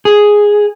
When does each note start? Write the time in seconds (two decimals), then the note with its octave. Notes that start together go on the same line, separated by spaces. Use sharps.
0.05 G#4